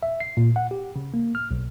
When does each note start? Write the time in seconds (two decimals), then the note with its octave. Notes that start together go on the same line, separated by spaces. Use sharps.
0.03 E5
0.20 C7
0.37 A#2
0.56 F#5
0.71 G4
0.96 C#3
1.14 A#3
1.35 F6
1.51 B1